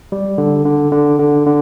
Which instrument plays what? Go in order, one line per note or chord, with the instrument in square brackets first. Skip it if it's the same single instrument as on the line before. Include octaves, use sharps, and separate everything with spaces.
[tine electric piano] G3
D3
D3
D3
D3
D3